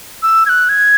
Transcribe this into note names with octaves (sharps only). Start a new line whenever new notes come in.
E6
G#6
F#6
G#6